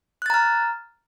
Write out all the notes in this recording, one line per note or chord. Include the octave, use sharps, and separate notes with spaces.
A#5 F6 F#6 A6